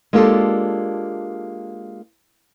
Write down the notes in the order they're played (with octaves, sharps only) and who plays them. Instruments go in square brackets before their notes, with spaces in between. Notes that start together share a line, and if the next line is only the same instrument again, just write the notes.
[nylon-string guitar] G#3 A#3 D4 F4 G4 A4